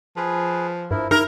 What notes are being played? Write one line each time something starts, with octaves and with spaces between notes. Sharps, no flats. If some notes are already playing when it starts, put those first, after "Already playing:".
F3 G#4 B4
G2 F3 E4 A#4
D#4 E4 A#4